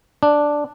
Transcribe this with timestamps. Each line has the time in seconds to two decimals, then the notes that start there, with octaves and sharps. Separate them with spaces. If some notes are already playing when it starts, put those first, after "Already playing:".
0.23 D4